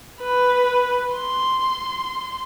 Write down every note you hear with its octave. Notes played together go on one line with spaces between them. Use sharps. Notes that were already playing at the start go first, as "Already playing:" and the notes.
B4
C6